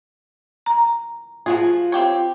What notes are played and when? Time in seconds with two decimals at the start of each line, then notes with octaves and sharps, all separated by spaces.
0.66 A#5
1.46 F3 F4 F#4 G#4
1.92 C4 G4 C#5